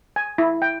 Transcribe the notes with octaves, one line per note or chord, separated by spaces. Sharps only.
G#5
E4
G5